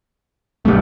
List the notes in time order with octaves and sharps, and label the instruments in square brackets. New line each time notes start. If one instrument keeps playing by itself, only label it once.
[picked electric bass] B1 G2 [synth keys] A3